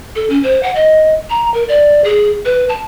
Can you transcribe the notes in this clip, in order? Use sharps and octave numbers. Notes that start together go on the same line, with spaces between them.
A4
C#4
C5
F#5
D#5
A#5
A#4
D5
G#4
B4
A5